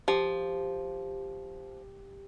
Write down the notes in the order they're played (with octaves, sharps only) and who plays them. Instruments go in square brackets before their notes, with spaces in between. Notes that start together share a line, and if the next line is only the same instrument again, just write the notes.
[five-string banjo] F3 [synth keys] G4